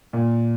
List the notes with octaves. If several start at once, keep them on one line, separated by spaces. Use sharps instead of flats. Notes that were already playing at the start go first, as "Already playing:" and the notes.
A#2